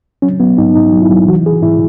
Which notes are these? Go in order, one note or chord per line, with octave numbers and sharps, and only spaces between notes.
F#3 C#4
F#3 B3
G#2 D#4
G#2 D#4
F#3
E4
F#3
E3 F#4
E3 G#4
G#2 E4